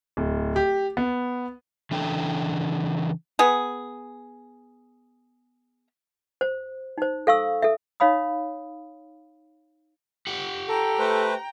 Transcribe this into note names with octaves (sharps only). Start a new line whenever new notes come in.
D1
G4
B3
C#3 E3 D4 A4 G5
B3 G#4
C5
D#4 C5
A4 F5 C#6 E6
A4 E5
D#4 C#5 F5 B5 D#6
G4 F#5
A4 G5 A#5
A3 B4 C5